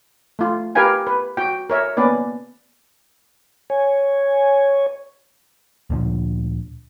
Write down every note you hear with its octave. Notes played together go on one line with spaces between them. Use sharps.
A3 F4
G4 A#4 B4 F5 G5 G#5
B4
F#4 G5
A#4 C#5 E5
A#3 B3 C#4 B4 D5
C#5 G#5
D2 A#2 D3 F3